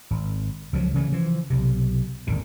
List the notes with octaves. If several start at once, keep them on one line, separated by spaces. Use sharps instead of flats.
G#1
C#2 F3 F#3
C#3 E3 G3 A3
E3 F3
B1 C3
D#1 G#1 D3 D#3